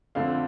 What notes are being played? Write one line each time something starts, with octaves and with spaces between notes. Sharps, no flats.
F2 D3 A3 C4 F5